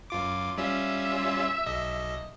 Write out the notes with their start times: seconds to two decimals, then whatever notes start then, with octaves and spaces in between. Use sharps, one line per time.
0.10 F#2 F4 D6
0.58 G3 C#4 F4 E5
1.66 B1 D#5